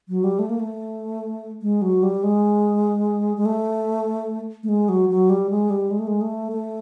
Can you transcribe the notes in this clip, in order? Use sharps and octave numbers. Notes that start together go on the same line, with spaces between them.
F#3
G3
A3
A#3
A3
G#3
F#3
G3
G#3
G#3
A3
A3
G#3
F#3
F#3
G3
G#3
G3
G#3
A3
G#3
A3
A3